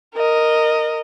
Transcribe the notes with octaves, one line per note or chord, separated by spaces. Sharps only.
A#4 D#5